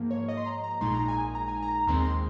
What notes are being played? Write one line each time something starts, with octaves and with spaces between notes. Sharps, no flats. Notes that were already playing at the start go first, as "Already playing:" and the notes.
Already playing: G#2 F3 A#3
C#5
D#5
C6
A#5
A#5
A#1 A#2 G#3 D#4 C6
A#5
G#5
A#5
G#5
A#5
D#2 D#3 G#3 C4 C6
A#5
C6